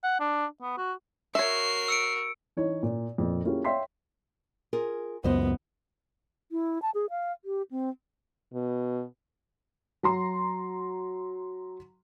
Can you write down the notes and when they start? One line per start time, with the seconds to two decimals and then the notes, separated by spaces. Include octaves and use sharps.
0.04 F#5
0.20 D4
0.62 B3
0.78 F#4
1.35 F#4 A#4 C#5 E5 C7
1.88 E6 C#7 D7
2.57 E3 D#4 C#5
2.83 A#2
3.18 F2 A#2
3.45 A#3 C#4 E4 F4 G4 G#4
3.64 C#5 E5 F5 G5 C6 B6
4.73 F4 G#4 A#4
5.24 C#2 F#2 B3 C5 D#5
6.52 E4
6.82 A5
6.95 G#4
7.10 F5
7.45 G4
7.71 C4
8.54 B2
10.03 F#3 A#5 C6